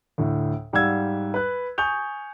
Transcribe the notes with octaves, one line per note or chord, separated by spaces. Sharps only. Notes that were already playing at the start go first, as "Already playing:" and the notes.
D2 A2
G#2 G3 F5 F#5 E6 G#6
B4 F#6
G#5 C#6 D#6 G6 F7